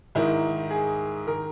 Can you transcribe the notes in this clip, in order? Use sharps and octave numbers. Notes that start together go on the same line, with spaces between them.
G#2 D#3 E4
G#4
D#3 A#4